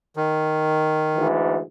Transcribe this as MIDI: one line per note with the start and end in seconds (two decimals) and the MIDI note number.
0.16 1.28 51
1.17 1.60 38
1.17 1.60 44
1.17 1.60 52